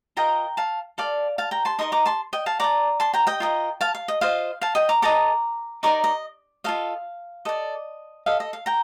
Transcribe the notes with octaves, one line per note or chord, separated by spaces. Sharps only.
F4 A#4 D#5 G5 A#5
F5 A5
A4 D5 F5
F5 A5
G5 A#5
A5 C6
D#4 A#4 D#5 C6 D#6
A#5 D6
A5 C6
D#5 G5
F5 A5
A4 D5 A#5 D6
A5 C6
G5 A#5
D#5 G5
F4 A#4 D#5
F5 A5
F5
D#5
F4 C5 D#5 F5
F5 A5
D#5 G5
A#5 D6
A4 D#5 A#5 D6
D#4 A#4 D5 A#5 D6
D#5
F4 A4 D#5 F5
A4 D5 D#5
A4 D#5 F5
D#5
F5
G5 A#5